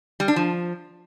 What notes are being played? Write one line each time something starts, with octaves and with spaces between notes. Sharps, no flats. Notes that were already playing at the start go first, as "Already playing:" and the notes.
G3
D4
F3